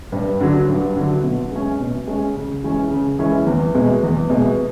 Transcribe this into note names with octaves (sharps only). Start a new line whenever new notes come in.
G2
D3 F#3
G2
D3 F#3
B2
G#3 C#4
B2
G#3 C#4
C#3
E3 G#3 C#4
C#3
E3 G#3 C#4
E2
B2 G#3
E2
B2 G#3